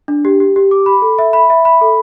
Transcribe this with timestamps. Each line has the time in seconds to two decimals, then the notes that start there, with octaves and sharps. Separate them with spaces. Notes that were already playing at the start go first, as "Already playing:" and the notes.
0.08 D4
0.25 G4
0.40 G4
0.56 G4
0.71 D6
0.86 B5
1.02 A4
1.19 E5
1.33 B5
1.50 E5
1.65 B5
1.81 A4